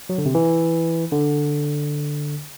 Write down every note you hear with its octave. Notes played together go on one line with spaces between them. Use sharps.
F#3
D3
C3
E3
D3